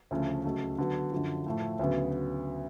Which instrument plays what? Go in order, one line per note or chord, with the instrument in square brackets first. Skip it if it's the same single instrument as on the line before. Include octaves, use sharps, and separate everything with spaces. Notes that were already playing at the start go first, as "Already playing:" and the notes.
[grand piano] D2 C#3 F3 A3
C#2 C#3 F#3 A3
D3 F#3 B3
F#2 D3 F3
A2 F3 A3
D2 C#3 F#3 B3